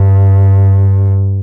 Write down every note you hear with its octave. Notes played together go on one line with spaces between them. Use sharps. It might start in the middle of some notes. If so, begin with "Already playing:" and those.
Already playing: G2